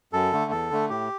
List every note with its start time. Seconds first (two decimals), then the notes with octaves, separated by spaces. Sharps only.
0.13 F#2 A4
0.32 D3 A3
0.51 E2 A4
0.71 D3 A3
0.90 A2 G4